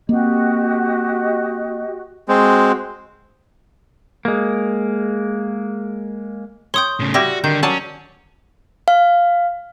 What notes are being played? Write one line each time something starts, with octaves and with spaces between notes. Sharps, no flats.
A#3 C4 F#4 G4 D#5
G#3 C4 F#4
G#3 A#3
C#5 G5 C6 D#6 G6
A2 C#3
G3 E4 F#4 G4 A#6
D3 D#3 G6
F#3 C#4 D5 A5
F5